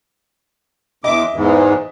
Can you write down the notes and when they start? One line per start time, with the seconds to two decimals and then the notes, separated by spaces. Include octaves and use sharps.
1.04 E2 D#5 E5 D6
1.34 E2 G#2 E3